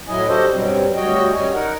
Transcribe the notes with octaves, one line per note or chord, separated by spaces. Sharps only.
A2 F#3 E4 D#5 G#5
D4 F#4 G4 A4 C5 D#5
G2 B2 F#3 G3 C4
D2 G3 F#4 C#5 D#5 G5
F#2 G3 C#5 G#5
D#4 A#4 F#5